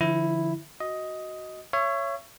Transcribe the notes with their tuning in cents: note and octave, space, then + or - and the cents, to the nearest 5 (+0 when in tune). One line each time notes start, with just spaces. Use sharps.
D3 +0 F3 -30 E4 +0
F#4 +0 D#5 +10
C#5 +0 E5 +35